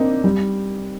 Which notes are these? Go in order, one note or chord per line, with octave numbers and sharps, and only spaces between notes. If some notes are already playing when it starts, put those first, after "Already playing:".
Already playing: A#3 C4 D4 D#4
G3